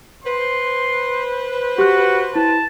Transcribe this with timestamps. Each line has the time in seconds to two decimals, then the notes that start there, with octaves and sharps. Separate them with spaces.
0.25 B4 C5 C6
1.78 F#4 G4 F#6
2.35 E4 A5